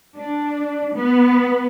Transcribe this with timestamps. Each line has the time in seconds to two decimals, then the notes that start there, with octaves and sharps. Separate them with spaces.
0.16 D4
0.95 B3